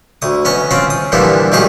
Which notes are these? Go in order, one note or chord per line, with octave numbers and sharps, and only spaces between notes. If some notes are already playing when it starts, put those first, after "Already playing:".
D2 D#6
B3 C#4 D#5
C4 C#4 F4 G5
D#6
A#2 D3 E3 F3 G3 B3
B1 A#2 D#3 G3 G#4 D#5